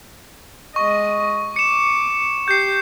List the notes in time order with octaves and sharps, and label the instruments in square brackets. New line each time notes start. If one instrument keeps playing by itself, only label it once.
[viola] G#3 D#5 [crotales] C#6
[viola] D6 [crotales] C#7 E7
[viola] G4 [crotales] G6 C7